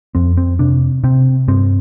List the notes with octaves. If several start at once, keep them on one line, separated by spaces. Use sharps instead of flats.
F2 C4
C4
C3 D4
C3 C4
G2 C4